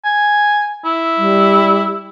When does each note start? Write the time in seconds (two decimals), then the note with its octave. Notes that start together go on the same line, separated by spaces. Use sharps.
0.05 G#5
0.85 E4
1.17 G3